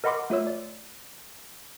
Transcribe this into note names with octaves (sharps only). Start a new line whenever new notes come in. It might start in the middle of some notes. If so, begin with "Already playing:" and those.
A#4 D#5 F#5 B5 C6 D6
A3 F4 C#5 E6
D5